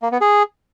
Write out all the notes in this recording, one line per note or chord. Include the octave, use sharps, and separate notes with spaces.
A#3
B3
G#4